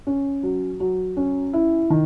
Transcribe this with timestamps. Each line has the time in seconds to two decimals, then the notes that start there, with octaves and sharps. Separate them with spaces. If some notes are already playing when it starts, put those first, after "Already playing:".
0.07 C#4
0.43 F#3
0.80 F#3
1.17 C#4
1.53 E4
1.90 D#3